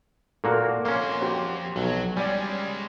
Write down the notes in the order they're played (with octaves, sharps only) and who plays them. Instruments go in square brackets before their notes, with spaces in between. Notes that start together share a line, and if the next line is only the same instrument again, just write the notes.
[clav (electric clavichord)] A#2 A#3 F#4 [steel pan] A4 A#4
[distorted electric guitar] F2 C6 [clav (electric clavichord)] A#3 C#4
[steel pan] F#4 G4 C5
[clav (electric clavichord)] B1 [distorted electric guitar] F#3
[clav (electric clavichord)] G3 [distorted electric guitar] G#3 C#4 [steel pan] D5 G#5